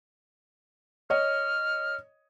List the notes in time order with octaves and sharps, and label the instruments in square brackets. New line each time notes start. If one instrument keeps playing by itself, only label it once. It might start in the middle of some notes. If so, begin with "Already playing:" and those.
[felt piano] C#5 D#5 [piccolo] F6